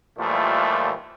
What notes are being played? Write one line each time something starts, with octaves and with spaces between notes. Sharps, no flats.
D#2 A#2 E3 F3 G3 A3